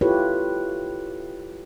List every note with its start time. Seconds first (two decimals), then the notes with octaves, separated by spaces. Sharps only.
0.01 E4 F4 G4 A4 B4 C#5